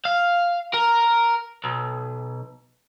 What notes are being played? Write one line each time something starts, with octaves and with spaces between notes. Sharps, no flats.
F5
A#4
B1